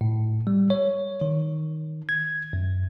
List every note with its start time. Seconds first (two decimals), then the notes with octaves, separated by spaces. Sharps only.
0.01 A2
0.47 G3
0.70 C#5
1.21 D#3
2.09 G#6
2.53 F#2